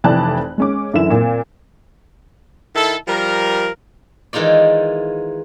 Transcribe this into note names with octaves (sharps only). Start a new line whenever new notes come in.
F1 F2 E3 D5 A5 F#6
G#3 C#4 D6
F#2 D3 E3 E4 E7
A#2 C4
D#3 E4 A4
F3 G3 A#4
D#3 E3 G#3 D#4 F4 D5